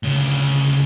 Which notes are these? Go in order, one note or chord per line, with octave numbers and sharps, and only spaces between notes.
D2 C#3